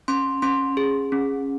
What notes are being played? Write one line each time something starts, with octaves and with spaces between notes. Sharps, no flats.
C#4 C6
C#4 C6
G#4
C#4